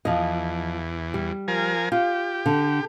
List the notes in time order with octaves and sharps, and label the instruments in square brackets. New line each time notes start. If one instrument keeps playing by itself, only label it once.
[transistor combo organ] E2 [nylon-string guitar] F3 D#5
[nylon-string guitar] G3
[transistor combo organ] F3 A#4 G#5
[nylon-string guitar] F4 [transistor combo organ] G4
[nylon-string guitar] D3